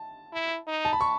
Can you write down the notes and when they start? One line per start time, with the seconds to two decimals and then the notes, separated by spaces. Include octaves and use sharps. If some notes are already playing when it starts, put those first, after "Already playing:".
Already playing: A5
0.33 E4
0.67 D#4
0.85 A5
0.93 B5
1.01 C#6